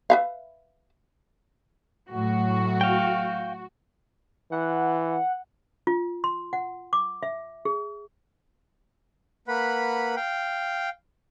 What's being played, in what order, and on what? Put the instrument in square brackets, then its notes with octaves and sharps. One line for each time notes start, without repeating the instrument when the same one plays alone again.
[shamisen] B4 E5 F5
[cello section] A2 F#3 [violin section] F#4
[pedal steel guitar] F5 G5
[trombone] E3 [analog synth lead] F#5
[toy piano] F4
C6
F#5
D6
E5
G#4
[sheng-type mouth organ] A#3 B4 F#5 B5
F5 G5